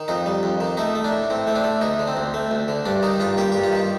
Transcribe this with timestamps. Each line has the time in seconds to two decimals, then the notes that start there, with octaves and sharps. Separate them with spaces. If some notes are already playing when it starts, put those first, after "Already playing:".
Already playing: D#3
0.08 F2 D#4
0.26 G3
0.43 F2
0.61 D#3
0.77 A3 D#4
0.95 A3
1.04 D4
1.12 A2
1.30 A2 C4
1.47 A3 C4
1.56 D4
1.64 A3
1.81 D2 D#4
1.99 D3
2.08 C4
2.17 D2
2.34 A3
2.51 D2
2.68 D3
2.86 G2 D4
3.03 D#3 D#4
3.20 G2 F4
3.38 A#3 G4
3.52 G2 G4
3.63 F4
3.72 D#3